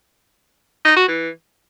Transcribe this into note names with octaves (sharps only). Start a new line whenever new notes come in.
D#4
F#4
E3